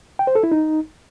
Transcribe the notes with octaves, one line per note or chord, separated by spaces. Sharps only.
G5
C5
A4
E4
D#4